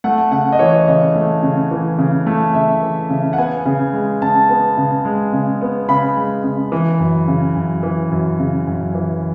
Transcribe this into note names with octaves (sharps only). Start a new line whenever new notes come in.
A3 F#5
C#3 F#5
D#5
E3 C#5
C#3 D#5
A3
C#3
E3
C#3
A3
C#3 E5
E3
C#3
F#5
B3 G#5
C#3
G#3
C#3 A5
B3
C#3
G#3
C#3
B3
C#3 B5
G#3
C#3
E3
F#2
C#3
F#2
E3
F#2
C#3
F#2
E3